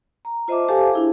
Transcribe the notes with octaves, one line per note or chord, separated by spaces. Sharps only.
A#5
F4 C5 D#5 E5 A5 D6
G4 A4 C5 F5 G#5 A5
D4 E4 G#4